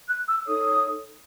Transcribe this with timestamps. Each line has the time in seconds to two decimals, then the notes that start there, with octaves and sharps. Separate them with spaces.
0.09 F#6
0.28 E6
0.46 D#4 A4 C#5 D#6